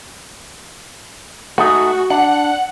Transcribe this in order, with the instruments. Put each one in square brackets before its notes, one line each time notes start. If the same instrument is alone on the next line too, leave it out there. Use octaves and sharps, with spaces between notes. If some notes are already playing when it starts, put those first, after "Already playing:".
[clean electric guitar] A3 D#4 G#4 [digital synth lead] F#4
[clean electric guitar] D4 [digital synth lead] F#5